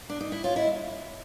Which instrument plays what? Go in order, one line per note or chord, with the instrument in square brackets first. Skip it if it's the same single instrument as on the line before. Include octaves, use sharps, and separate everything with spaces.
[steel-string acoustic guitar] D4
D#4
E4
[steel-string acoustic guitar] F4 [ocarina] C#5
[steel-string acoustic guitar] E4 [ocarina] D#5